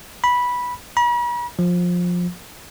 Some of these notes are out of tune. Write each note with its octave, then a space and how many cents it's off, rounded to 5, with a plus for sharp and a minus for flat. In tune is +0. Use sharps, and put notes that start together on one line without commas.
B5 -10
B5 -45
F3 +20